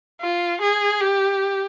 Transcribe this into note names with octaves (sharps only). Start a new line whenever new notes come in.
F4
G#4
G4